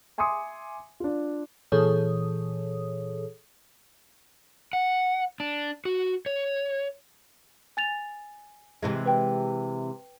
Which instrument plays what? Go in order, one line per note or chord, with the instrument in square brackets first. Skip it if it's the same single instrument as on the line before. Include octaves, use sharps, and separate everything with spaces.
[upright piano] E5 G#5 C6 D6 D#6 C#7
D4 F4
[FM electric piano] A#2 E3 G#4 A4 C#5 D#6
[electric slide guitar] F#5
D4
F#4
C#5
[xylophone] G#5 A6 F7
[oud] C3 E3 G#3
[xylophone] B4 G5